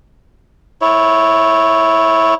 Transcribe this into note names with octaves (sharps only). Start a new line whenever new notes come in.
E4 C#5